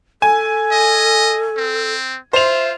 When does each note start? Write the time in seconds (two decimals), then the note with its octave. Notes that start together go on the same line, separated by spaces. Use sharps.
0.22 A4 G#5
0.71 D#5
1.57 C4
2.33 F4 C5 E5 F7